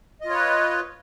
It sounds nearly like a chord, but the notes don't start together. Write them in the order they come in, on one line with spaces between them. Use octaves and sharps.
D#5 F4 C#5 B4